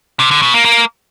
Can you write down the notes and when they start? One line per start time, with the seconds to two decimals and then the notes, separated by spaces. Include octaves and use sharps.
0.20 C3
0.31 D3
0.42 B2
0.54 A#3
0.65 A#3